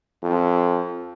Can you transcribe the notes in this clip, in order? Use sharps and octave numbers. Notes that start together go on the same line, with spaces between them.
F2